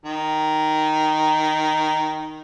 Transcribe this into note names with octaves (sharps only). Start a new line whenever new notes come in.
D#3 A#5